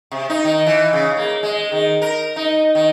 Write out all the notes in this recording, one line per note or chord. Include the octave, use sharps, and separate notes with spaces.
C3
D#4
D#3
E3
C#3
A#3
G#3
D#3
A#4
D#4
D#3